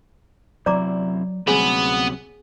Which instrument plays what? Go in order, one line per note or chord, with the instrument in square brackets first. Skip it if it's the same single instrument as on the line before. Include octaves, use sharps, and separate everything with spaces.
[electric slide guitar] F#2 C3 E4 [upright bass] F#3 [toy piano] D5 A#5 D6
[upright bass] D2 G3 [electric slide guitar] C3 F#3 C#4 [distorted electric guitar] B3 [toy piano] G#4 G#5